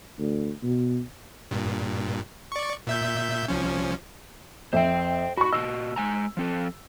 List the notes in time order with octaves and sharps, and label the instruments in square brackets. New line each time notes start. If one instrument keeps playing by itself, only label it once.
[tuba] D2
B2
[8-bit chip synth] G2 A#2
D5 C#6
A#2 E5 G6
C2 F3 C#4
[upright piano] F2 E5 [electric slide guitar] C5 G5
[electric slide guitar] F#4 [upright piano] B5 C#6
[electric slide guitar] A#2 F#4 D#5 [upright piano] E6
[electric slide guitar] G#3 G#5 A#5
F3 C4 A4